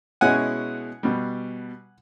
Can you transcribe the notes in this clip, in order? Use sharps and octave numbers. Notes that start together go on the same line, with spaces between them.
B2 G#3 C#4 E4 F#5 G#5
B2 G3